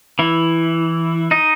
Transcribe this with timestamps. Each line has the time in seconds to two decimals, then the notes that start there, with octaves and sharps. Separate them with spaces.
0.19 E3 E4
1.31 D#4 D#5